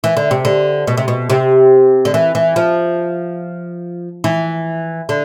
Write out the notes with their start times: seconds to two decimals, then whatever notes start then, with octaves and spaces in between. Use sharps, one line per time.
0.04 E3
0.17 D3
0.31 C3
0.45 D3
0.87 B2
0.97 C3
1.08 B2
1.30 C3
2.05 D3
2.14 E3
2.35 E3
2.56 F3
4.24 E3
5.09 D3